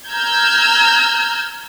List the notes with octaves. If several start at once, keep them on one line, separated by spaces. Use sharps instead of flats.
A#5 E6 F6 G6 G#6